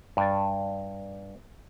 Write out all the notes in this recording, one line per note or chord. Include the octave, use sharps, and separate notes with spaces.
G2 D5